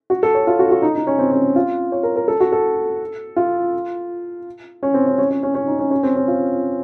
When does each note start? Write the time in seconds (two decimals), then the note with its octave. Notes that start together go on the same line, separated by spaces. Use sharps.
0.10 F#4
0.23 A4
0.35 C#5
0.47 F4
0.59 F#4
0.71 F#4
0.82 D#4
0.95 D#4
1.07 C#4
1.19 C4
1.31 C#4
1.56 F4
1.92 C#5
2.03 A#4
2.16 A#4
2.28 A4
2.40 F#4
2.52 A4
3.36 F4
4.83 C#4
4.94 C4
5.07 C#4
5.18 C#4
5.30 C#4
5.43 C#4
5.55 C#4
5.67 D#4
5.79 C#4
5.91 C#4
6.03 C4
6.15 C#4
6.28 F4